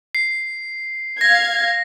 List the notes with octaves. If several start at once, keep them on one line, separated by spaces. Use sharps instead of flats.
C7
F5 G#6 A#6